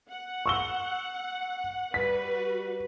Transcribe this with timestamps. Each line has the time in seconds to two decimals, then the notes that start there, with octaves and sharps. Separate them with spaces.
0.10 F#5
0.46 C#6 E6 G7
1.94 G3 F#4 B4 B6